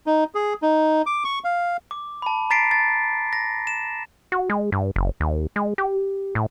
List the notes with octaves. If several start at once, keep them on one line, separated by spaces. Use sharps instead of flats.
D#4
G#4
D#4
D6
C#6
F5
D6
A5 B5
A#5 A6 B6 C7 D7
A6
A#6
E7
F#4
G#3
G2
F#1
D#2
G#3
G4
A2